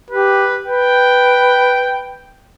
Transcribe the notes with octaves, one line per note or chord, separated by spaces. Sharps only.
G4 B4
B4 G5